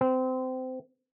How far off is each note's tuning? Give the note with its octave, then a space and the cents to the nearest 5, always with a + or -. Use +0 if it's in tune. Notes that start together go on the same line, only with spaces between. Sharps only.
C4 -25